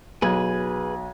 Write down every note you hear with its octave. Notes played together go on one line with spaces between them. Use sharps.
B1 G#4 B4 G#6